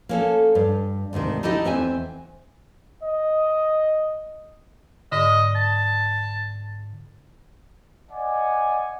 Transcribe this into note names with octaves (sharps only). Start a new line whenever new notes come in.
A#3 C#4 A4
G2
D2 G#2 C3 D#3
D#4 E4 G4 A4 D#5
E2 C4 E5 G#5
D#5
G#2 D3 D#5
A5
D5 D#5 F#5 G#5